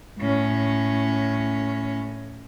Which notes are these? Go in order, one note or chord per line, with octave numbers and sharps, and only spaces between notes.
A2 C#4